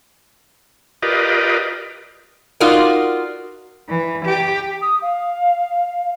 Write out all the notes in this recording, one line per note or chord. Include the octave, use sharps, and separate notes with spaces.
F4 G4 A#4 B4 D5 D#5
D#4 F4 F#4 A#4 D5 D#5
E3
G4
D#6
F5